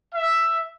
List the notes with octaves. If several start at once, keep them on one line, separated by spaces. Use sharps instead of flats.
E5